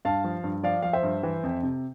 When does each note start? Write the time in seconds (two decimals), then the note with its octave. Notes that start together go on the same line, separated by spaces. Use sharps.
0.05 G2 F5 A5
0.24 F3
0.44 G2
0.63 F3 D5 F5
0.82 F3 F5
0.93 C5 E5
1.03 G2
1.23 E3
1.43 F2
1.63 C3